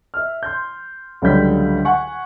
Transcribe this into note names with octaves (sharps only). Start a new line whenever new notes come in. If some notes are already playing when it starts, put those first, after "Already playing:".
E5 F6
C6 G6
C#2 D3 F#3 G3 G6 B6
F#5 G#5 C#6